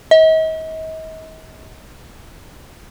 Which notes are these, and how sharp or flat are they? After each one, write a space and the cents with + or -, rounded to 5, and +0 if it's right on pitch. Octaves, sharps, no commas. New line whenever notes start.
D#5 +40